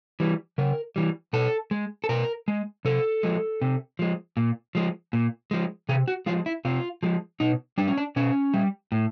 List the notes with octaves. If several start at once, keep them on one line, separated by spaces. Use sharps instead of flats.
E3 G3
C#3 A#4
E3 G3
B2 A4
G#3
A4
B2 A#4
G#3
C3 A4
F3 G#3
C3
F3 G#3
A#2
F3 G#3
A#2
F3 G#3
C3 G#4
F#4
F3 G#3 F4
E4
C3 F4
F3 G#3
B2 D#4
G3 D4
C#4
D4
B2 C#4
G3
A2